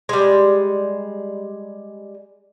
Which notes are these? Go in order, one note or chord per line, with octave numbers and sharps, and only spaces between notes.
G3 G#3